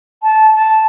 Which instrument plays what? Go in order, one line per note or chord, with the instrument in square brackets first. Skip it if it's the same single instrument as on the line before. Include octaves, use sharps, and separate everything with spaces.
[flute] A5
A5